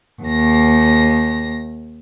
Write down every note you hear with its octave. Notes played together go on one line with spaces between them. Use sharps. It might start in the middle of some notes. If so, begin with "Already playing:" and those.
D#2 A#6